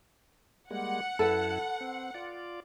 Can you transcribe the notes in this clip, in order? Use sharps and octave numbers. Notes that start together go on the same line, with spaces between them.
G3 G#3 A#3 F#5
F#2 E4 A4 B4
C4
F4 D5